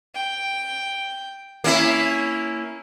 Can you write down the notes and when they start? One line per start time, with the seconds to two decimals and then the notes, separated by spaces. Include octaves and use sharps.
0.15 G5
1.64 A#3 C#4 E4